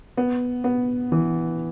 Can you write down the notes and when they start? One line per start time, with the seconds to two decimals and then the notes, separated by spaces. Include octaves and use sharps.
0.17 B3
0.64 B3
1.12 E3